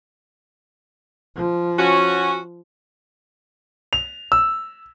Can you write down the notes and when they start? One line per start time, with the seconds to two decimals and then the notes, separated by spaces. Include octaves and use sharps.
1.36 F3
1.79 C#4 F#4
3.93 F7
4.32 E6